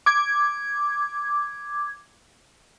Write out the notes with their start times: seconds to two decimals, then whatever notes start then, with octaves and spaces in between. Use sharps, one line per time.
0.06 D6 G#6